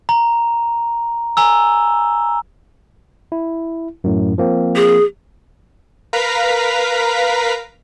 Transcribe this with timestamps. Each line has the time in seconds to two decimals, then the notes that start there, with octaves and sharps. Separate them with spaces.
0.09 A#5
1.37 G#5 A#5 E6
3.32 E4
4.04 F#2 A2
4.38 F3 A#3 C4
4.76 G#4
6.13 A#4 B4 F5 A#5 B6